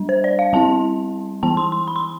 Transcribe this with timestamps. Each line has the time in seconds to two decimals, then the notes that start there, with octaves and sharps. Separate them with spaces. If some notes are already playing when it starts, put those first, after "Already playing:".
Already playing: G3 D4
0.09 C5
0.24 D5
0.39 F5
0.53 G3 C4 E4 A5
1.43 E3 B3 E4 A5
1.57 C6
1.72 C6
1.88 B5
1.96 C6